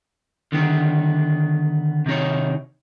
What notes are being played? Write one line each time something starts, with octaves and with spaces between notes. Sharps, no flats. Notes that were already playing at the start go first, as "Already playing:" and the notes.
D3 D#3 B3
C3 D#3 D#4 C#5